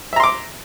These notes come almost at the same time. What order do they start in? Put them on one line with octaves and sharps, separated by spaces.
E5 A#5 C6 D6